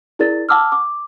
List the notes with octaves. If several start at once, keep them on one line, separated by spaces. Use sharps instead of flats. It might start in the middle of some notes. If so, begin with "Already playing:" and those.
E4 G#4 A#4 D5 A6
F#5 A5 D6 E6 F6
D6